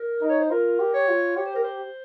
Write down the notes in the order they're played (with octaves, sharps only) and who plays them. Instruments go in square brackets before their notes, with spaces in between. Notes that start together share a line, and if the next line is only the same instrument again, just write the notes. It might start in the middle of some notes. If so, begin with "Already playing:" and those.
Already playing: [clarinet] A#4
[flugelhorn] D#4
[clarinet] C#5
C5
[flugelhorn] F4 [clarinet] A#4
[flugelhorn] G4
[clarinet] C#5
[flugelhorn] F4
[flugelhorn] G4 [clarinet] C#5
[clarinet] C5
A#4
C5